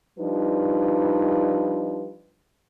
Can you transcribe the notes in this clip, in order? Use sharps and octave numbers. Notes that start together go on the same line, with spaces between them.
F3 G3 D4 D#4 B4